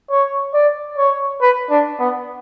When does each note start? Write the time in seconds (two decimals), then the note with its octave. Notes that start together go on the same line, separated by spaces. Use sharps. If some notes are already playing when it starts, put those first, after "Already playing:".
0.10 C#5
0.54 D5
0.97 C#5
1.41 B4
1.70 D4
2.00 B3